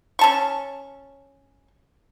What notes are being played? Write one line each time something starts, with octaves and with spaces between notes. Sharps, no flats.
C#4 A5 C#6